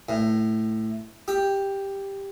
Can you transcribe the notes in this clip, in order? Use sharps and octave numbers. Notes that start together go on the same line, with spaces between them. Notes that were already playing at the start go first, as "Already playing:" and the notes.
A2
G4